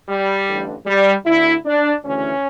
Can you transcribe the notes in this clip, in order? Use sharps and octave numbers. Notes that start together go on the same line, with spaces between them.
G3
A1 G2 D3
G3
D2 D3 E4
D4
D2 C#3 E3 C#4